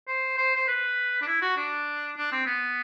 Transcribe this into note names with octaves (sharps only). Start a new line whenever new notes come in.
C5
C5
C5
B4
D4
E4
F#4
D4
D4
C4
B3